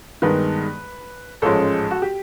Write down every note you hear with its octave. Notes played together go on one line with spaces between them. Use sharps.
G2 D#3 G#3 B3 B4
A1 G#2 F3 G#3 C#4 A4
F#4
G4